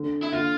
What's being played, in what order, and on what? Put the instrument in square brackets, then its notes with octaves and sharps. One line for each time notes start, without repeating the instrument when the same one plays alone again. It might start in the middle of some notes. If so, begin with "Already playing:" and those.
Already playing: [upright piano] D3
[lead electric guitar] E4
[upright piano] D3 [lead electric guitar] F4